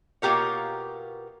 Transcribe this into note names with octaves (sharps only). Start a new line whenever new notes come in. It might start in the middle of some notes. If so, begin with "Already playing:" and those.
B2 A#3 F4 G4 A#4 C#5